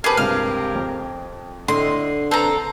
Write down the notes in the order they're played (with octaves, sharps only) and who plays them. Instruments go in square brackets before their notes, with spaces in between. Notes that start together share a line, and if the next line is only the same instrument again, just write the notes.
[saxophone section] C4 G4 A#4 [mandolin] G#4 B4 [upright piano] A5 D6 G#6
[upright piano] C#2 G2 C3 [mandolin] F6
[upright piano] F2
[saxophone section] A2 D#5 [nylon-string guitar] D3 [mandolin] C6
[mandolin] C4 A#5 [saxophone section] A4 [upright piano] B4 A5